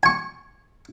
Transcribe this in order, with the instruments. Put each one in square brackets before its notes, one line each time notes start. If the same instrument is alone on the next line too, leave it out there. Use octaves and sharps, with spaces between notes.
[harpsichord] G#5 C#6